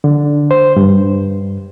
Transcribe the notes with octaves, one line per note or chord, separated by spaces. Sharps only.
D3
C5
G2